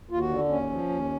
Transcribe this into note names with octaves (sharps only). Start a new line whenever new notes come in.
D#2 F4
F#4
D3
D#2 C#4
F3
D#2